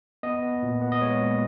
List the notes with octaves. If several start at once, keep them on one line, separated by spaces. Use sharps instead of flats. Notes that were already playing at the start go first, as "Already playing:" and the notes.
B3 D#5
B3
A#2
B3
D#5
G#3 C#5
A#2